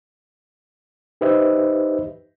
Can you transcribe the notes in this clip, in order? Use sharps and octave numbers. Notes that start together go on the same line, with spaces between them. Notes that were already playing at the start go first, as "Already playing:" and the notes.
D#4 G4 B4 C5 D#5 E5